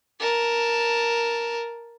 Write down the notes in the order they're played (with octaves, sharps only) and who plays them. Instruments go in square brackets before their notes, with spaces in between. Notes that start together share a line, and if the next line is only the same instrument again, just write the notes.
[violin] A#4 A5